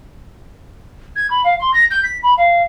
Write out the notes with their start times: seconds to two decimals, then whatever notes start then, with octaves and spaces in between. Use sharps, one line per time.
1.16 G#6
1.30 B5
1.44 F5
1.60 C6
1.74 A#6
1.91 G6
2.03 B6
2.23 B5
2.38 F5